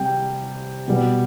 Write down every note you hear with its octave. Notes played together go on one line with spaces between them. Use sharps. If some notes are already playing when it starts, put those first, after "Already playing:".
Already playing: C3 G3 G5
B2 G3 B3